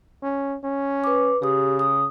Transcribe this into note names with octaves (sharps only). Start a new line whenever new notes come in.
C#4
C#4
B4 D6
C#3 G4 D#6
D#6